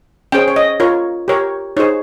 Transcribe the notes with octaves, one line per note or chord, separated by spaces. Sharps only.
C#4 G#4 C5 G5
C#5
D#5
F4 A#4 C#5
G4 A#4 C#5
D#4 G#4 C5 C#5